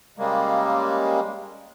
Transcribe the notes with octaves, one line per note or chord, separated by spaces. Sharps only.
C#3 G3 G#3 A#3